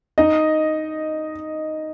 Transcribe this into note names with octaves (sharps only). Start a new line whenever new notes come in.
D#4 D#5